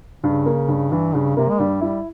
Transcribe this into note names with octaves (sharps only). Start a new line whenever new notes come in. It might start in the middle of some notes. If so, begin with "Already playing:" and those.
G2 C#3
A#3
G2
G2 E3
G2 C#3
C3 A#3
G#3
G2 G3
G3 E4